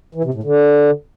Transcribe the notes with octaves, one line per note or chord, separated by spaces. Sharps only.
E3
C3
A2
D3